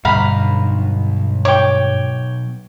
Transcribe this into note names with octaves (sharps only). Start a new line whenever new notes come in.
B1 G2 D3 F5 A#5 B5
C#5 G5 D6